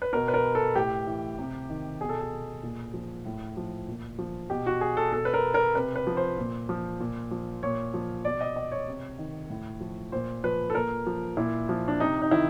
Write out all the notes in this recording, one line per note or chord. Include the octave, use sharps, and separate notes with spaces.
B4
B2 A#4
B4
A#4
A4
A2 G4
E3
C3
D#3
B2 G#4
A4
G#4
A#2
F3
A2
F3
A#2
F3
B2 G4
F#4
G#4
A4
B2 A4
B4
A#4
A#4
C3 B4
B4
F3
C5
A#2
F3
A#2
F3
A#2 C#5
F3
B2 D5
D#5
D#5
C#5
C3
D#3
A2
F3
A#2 C5
F3 B4
A4
A#2 A#4
F3
A#2 E4
F3
D4
C3 D#4
D#4
D#3 E4